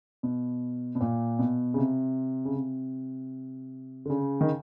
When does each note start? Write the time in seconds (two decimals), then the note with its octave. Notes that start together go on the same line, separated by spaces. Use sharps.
0.23 B2
0.95 B2
1.01 A#2
1.39 B2
1.74 C#3
1.78 C3
2.45 C#3
2.55 C3
4.06 D3
4.10 C#3
4.41 D#3